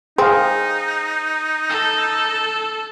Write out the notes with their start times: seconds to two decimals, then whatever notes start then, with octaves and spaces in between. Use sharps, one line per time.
0.18 C4 D#4 G#4 F5
1.70 A4